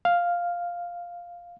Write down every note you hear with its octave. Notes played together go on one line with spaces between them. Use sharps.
F5